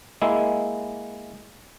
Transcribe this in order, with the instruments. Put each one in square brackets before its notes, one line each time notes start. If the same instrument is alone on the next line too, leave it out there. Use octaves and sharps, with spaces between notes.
[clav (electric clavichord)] G#3 A#3 E4